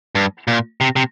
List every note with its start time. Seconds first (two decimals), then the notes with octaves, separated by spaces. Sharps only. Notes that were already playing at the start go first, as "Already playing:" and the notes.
0.15 G2
0.48 A#2
0.81 C3
0.96 C3